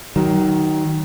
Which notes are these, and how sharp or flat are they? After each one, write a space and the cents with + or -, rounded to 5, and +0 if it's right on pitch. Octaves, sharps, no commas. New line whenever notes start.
D#3 +5 F#3 +30